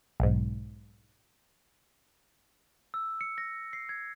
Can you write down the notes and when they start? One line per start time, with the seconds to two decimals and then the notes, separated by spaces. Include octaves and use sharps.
0.20 B1 G#2
2.94 E6
3.21 C#7
3.38 A#6
3.73 C7
3.89 G#6